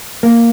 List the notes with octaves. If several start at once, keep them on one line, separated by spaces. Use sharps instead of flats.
A#3